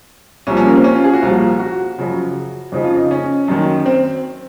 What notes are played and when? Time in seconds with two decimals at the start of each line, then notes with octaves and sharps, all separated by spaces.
0.47 C2 A#2 F3 C#4
0.57 C#4
0.67 A#3
0.76 C4
0.84 C#4
0.95 F4
1.04 G#4
1.14 F#4
1.22 C2 A#2 F3 F4
1.60 F#4
1.98 F#2 C#3 F3
2.72 F2 C#3 F3 D#4
2.84 F4
2.96 D#4
3.11 C#4
3.48 F#2 D#3
3.86 C4